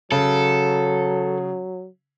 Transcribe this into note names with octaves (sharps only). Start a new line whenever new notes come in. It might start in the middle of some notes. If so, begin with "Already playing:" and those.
C#3 F#3 A4